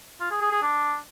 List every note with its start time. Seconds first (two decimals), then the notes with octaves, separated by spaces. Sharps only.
0.20 F4
0.31 G#4
0.41 G#4
0.52 G#4
0.62 D4